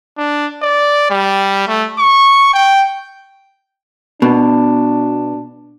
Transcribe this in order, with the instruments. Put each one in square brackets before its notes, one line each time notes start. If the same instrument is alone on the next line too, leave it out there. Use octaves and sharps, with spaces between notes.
[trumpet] D4
D5
G3
A3
C#6
G5
[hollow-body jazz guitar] B2 [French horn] D4